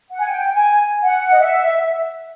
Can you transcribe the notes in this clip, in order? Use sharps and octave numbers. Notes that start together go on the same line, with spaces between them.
F#5
G#5
G5
G#5
F#5
D#5
E5